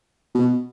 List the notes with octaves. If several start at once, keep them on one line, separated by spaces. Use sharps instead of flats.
B2